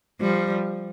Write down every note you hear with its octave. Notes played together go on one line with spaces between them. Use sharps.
F3 G3